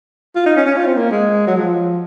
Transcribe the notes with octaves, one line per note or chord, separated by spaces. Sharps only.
F4
D#4
C#4
C#4
F4
C4
A#3
G#3
F#3
F3